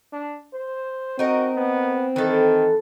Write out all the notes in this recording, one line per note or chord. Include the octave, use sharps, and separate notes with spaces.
D4
C5
C4 D#4 F#4 A#4 D#5
B3
D#3 E3 A4